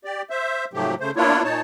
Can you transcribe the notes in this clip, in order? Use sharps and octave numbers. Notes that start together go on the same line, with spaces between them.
G4 D5
C5 E5
G#2 C3 F3 F#3 A3 G4
C#3 A3 C5
A#3 B3 D4 E4 F4 C#5
A#2 D#4 C#5 A5